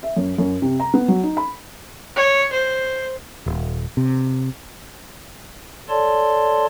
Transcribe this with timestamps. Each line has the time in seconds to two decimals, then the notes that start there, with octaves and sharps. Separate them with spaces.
0.03 E5
0.16 F#2
0.38 F#2
0.62 C3
0.80 A#5
0.94 B3
1.08 F#3
1.23 D#4
1.37 B5
2.16 C#5
2.53 C5
3.46 D#1
3.97 C3
5.89 A4 C#5 D5 A5 C6